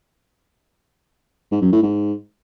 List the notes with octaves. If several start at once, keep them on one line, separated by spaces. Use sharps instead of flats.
G#2
F#2
A2
G#2